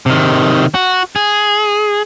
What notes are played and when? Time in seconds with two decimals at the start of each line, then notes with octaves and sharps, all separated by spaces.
0.06 C3 D#3
0.74 F#4
1.16 G#4